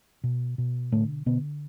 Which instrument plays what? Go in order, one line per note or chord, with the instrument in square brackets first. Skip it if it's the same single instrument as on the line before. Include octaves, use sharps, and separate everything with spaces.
[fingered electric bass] B2
B2
A2 D3 A3
B2 D3 B3